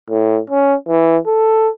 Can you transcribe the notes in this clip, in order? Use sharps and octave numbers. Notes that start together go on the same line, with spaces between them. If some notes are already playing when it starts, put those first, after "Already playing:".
A2
C#4
E3
A4